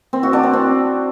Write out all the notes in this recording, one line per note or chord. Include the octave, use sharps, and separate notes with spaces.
C4
F#4
D4
C4
C4